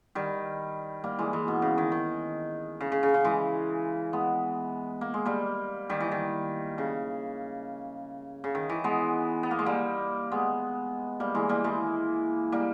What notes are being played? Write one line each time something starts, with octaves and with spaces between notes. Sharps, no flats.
D#3 G3
G3 A#3
E3 G#3
E3 G#3
B2
C#3
D#3
D#3
C#3
C#3
C#3
C#3
E3 G#3
G#3 B3
A#3
G#3
G3 A#3
D#3 G3
E3
D#3
C#3
C#3
D#3
E3
G#3 B3
B3
A#3
G#3
G3 A#3
G#3 B3
G3 A#3
E3 G#3
G3 A#3
E3 G#3
G3 A#3